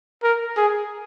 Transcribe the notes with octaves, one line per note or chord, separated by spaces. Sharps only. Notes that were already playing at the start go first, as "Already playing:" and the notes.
A#4
G#4